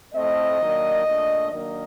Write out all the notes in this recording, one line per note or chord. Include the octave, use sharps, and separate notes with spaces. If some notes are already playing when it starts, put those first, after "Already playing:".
A2 A3 C4 D#5
D#3 F#3 A#3 D4
A#2 A3 D4
D#3 F#3 A#3 D4 D#5